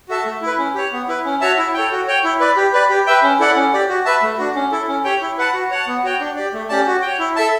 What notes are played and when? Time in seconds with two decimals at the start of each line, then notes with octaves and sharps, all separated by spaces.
0.09 F#4 A4 E5 A5
0.26 A3
0.42 E4
0.47 B4
0.58 C#4
0.75 G4 C#5
0.92 B3
1.08 E4 B4
1.25 C#4
1.41 F#4 C#5 E5 A5
1.58 E4
1.74 A4 C#5 G5
1.91 F#4
2.07 C#5 G5
2.24 E4
2.40 B4 D5
2.57 G4
2.74 B4 D5
2.89 G4
3.06 B4 E5 G5
3.23 C#4
3.39 E4 A4 D5 F#5
3.56 C#4
3.73 G4 D5
3.89 F#4
4.05 B4 E5 A5
4.22 A3
4.38 D4 F#4
4.56 C#4
4.71 E4 A4
4.88 C#4
5.04 G4 C#5 G5
5.21 E4
5.38 B4 F#5 A5
5.54 F#4
5.71 C#5 F#5 A5
5.87 B3
6.03 F#4 C#5 G5
6.20 D4
6.36 G4 D5
6.53 A3
6.69 C#4 G4 D5 A5
6.87 F#4
7.02 C#5 G5
7.19 E4
7.36 A4 E5 A5